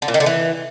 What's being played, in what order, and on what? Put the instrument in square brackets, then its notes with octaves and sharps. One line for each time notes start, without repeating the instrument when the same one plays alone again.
[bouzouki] D3
A#2
D#3
D3
E3